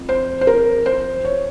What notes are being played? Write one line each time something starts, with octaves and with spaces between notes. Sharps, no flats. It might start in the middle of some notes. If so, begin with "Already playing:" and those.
Already playing: F2
C5
C5
A#4
C5
C#5